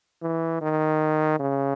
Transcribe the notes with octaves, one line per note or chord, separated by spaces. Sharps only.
E3
D#3
C#3